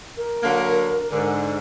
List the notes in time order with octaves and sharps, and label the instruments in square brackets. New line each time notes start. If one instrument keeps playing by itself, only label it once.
[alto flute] A#4
[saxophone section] D3 F#3 A#3
G#2 D3